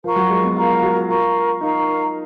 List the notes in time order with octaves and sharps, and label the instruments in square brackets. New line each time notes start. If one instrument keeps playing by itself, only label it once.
[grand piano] F3 [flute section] A#4 F5 A#5 C#6
[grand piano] F#3
G#3
B3
[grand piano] F4 [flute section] A#4 F5 A#5 C#6
[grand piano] F#4
[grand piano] F4 [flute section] A#4 F5 A#5 C#6
[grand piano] D#4 [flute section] A#4 F5 A#5 C#6